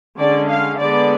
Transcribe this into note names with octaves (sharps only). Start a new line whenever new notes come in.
D3 G#3 C#4 D5
F5
D3 G#3 B3 D5